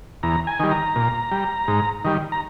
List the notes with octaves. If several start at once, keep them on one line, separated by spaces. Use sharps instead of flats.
E2 A#5
G#5
D#3 G3
A#5
A#2
G3
G#2
D#3 G3
A#5